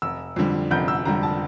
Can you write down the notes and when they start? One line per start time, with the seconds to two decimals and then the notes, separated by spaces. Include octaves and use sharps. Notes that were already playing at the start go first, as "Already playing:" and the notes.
0.02 F1 E6
0.36 F2 D3 G3
0.71 F1 G6
0.88 E6
1.05 F2 D3 G3 A#5
1.23 A5